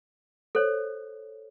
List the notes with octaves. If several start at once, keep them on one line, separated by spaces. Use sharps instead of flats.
A4 C5 C#5